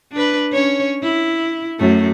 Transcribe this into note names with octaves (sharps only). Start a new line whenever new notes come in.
D4 B4
C#4 C#5
E4
F#2 A3